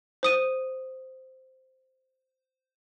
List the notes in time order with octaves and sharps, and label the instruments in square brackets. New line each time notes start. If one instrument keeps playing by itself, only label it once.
[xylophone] C5 D#6 D#7